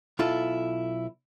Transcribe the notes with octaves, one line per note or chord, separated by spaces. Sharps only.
B1 E4 F4 A4